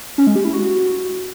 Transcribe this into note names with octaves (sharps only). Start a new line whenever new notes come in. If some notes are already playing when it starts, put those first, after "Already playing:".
C#4
G#3
G4
E4
F#4